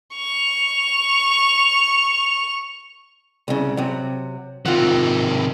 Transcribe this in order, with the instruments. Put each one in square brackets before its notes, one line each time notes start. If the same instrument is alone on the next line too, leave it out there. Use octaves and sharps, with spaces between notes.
[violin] C#6 F7
[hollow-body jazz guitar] C2 C#3
C3 F#3
[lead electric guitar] C3 D#3 [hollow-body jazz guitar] F4 F#5